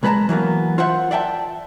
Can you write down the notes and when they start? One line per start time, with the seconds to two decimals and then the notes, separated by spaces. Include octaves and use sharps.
0.03 B1 G#3 B4 C#5 A5 A#5
0.29 E3 F#3 A#3 B3
0.78 F4 C5 E5 F#5
1.11 D5 E5 G5 A5